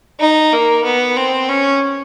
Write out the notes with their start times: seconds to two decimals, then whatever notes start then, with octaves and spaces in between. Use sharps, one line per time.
0.20 D#4
0.53 A#3
0.84 B3
1.16 C4
1.49 C#4